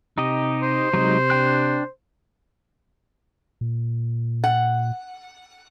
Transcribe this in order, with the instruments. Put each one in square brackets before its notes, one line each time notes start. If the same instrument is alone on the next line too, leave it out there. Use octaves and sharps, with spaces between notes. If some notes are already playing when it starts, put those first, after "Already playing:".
[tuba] C3 [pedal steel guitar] D#4 G4 D#5
[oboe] C5
[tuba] C3 [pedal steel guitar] F#3 G#3 D#4
[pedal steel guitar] D4 G5 F#6
[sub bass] A#2
[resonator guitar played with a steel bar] F#5